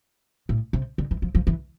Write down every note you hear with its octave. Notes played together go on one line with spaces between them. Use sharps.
A2
C3
D3
E3
F3
F3
E3